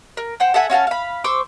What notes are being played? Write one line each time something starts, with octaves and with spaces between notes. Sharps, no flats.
A#4
C5 F#5 G5
A4 E5 F#5 G#5
C#4 F#4 F5 A5
F5 B5
C5 C#6 D6 E6